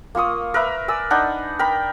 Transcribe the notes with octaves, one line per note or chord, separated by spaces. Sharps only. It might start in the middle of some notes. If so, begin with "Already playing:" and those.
A#3 F4 C#6 D#6
A#4 B4 E5
D5 G#5 E6
D4 D#4 F#5 B5
A#4 G5 B5